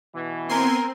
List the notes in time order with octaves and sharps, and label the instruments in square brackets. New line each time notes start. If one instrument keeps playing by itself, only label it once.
[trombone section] B2 E3
[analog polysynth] B3 G#5 C6 [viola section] C4 [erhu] A#4